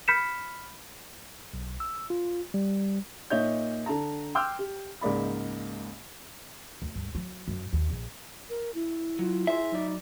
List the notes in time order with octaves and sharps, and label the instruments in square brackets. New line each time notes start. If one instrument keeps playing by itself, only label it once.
[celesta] B5 F6 G6 B6 C#7 E7
[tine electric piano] B1
E6
F4
G3
[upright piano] A#2 D#4 C#5 D#5 E5 G6
D3 A5 A#5
G5 C6 D6 E6 F6 G6
G4
C#2 G#2 A#3 D5 B5
[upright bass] D2
G2
F#3
F#2
D#2
A#1
[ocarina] A#4
E4
[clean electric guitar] F#3 [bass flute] F4
[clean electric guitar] G#4 C5 [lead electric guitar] E5
[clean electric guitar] F#3 D5 [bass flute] D#4